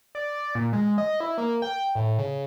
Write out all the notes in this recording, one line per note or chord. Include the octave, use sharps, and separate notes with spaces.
D5
A#2
G#3
D#5
E4
A#3
G5
A2
C#3